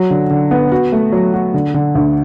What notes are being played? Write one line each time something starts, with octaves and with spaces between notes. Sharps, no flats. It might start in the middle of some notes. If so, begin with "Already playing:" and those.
Already playing: F#3
D3
D3
B3
F#4
A3
F#3
F#4
D3
D3
D2